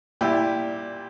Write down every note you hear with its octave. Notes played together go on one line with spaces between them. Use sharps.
A#2 G3 E4 G4